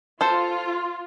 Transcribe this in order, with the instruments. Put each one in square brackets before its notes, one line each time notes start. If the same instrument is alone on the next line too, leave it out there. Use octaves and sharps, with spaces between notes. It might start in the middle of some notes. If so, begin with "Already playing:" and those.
[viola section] F4 [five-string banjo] A4 C5